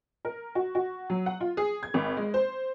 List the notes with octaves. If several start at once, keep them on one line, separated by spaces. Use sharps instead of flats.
A#4
F#4
F#4
F#3
F#5
F4
G#4
G#6
G#1
G#3
C5